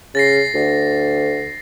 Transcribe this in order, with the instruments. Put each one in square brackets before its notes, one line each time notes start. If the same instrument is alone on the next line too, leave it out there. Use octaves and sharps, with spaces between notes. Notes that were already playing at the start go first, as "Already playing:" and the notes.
[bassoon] C#3 [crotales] A6 A#6 C7
[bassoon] D2